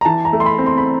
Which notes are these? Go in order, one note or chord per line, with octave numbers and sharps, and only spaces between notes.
A#5
E3 A5
A#5
A3
C6
B5
C4
C6
B5